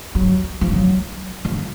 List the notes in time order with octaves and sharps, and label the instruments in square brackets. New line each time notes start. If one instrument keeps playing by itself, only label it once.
[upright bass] F#3
F3
F#3
F3